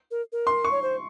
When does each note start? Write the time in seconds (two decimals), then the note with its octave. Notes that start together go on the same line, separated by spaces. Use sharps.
0.11 A#4
0.32 A#4
0.47 C6
0.65 C#6
0.71 C#5
0.82 C5